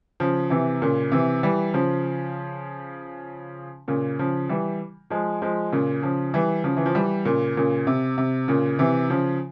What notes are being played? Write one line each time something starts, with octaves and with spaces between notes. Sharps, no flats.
C#3 F3
C3 E3
A#2 C#3
C3 E3
E3 G3
C#3 F3
A#2 C#3
C#3 F3
E3 G3
F3 G#3
F3 G#3
A#2 C#3
C#3 F3
E3 G3
C#3 F3
E3
F3
E3 G3
A#2 C#3
A#2 C#3
C3
C3
A#2 C#3
C3 E3
C#3 F3